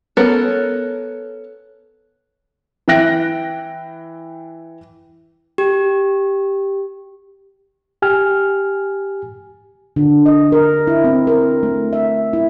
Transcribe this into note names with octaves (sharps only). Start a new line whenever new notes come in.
B3 C#4 A4 A#4
E3 E5 G5 F#6 A#6 D7
G4
G4 G#5 F6
D3
D#5
A#4
E4
C4
A#4
A3
E5
E4